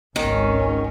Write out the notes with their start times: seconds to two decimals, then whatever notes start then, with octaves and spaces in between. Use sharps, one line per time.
0.16 G#1 C#2 D#3 C#4